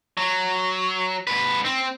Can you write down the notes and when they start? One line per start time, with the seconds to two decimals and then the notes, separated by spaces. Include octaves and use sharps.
0.18 F#3
1.27 G#2 B4
1.65 C4